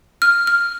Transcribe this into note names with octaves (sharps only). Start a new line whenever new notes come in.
F6
F6